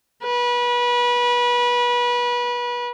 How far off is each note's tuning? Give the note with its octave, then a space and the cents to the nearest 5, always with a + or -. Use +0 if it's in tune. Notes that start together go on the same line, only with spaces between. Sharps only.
B4 -30